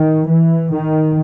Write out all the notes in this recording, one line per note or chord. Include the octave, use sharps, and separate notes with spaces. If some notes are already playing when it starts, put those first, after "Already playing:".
Already playing: D#3
E3
D#3